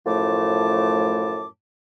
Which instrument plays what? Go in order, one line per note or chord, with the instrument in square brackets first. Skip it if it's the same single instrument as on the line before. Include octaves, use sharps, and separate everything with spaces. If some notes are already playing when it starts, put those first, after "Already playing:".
[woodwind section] F#2 A2 F3 A3 A5 D6